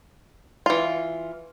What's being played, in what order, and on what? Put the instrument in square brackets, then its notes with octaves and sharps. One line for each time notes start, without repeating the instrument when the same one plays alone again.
[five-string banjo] E3 F4